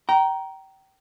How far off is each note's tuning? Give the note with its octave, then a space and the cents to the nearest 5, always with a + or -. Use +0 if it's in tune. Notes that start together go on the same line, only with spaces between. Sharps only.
G5 -25 A#5 +10